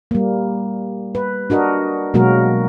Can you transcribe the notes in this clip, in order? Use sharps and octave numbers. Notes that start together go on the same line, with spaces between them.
G3 A#3
B4
D4 F#4 A#4 D#5
B2 F#3 G#3 A#3 F#4 A#4